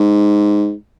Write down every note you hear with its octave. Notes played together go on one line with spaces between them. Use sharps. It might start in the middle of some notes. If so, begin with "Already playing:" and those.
Already playing: G#2